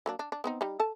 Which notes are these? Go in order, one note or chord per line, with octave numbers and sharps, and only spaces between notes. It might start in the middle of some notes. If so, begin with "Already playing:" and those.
F#3 A#3 D4
D4
D4
B3 C4 D#4
G3 D#4
A4 A5